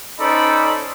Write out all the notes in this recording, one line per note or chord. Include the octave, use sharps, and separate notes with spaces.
C#4 D#4 A4 C5 D5 B5